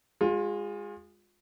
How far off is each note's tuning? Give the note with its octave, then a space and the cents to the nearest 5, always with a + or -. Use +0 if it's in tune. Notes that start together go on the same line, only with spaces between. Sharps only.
G#3 -20 F4 +30